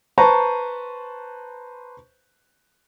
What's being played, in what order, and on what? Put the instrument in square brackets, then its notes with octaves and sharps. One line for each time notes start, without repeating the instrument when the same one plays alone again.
[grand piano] B4 C5 A5 A#5 C#6